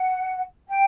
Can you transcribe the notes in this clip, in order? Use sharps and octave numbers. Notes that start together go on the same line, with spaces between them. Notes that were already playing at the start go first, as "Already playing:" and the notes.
Already playing: F#5
G5